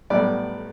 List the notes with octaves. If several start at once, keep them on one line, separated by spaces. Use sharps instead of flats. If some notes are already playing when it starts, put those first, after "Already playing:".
B1 A2 G3 B3 D5